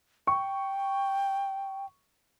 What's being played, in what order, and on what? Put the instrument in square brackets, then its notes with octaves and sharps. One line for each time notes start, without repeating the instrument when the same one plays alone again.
[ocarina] G5 [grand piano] C#6